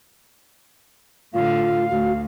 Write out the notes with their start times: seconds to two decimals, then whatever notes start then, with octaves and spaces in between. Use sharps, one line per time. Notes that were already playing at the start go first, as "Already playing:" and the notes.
1.34 A2 D3 F4 F5
1.90 D2 F#4